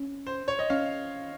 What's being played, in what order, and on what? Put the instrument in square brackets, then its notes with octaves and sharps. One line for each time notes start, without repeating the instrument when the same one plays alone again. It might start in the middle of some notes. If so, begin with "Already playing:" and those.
Already playing: [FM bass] C#4
[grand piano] C5
C#5
D#5
[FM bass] C#4 [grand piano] F5